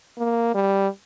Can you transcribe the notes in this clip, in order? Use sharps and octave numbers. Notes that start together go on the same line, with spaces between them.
A#3
G3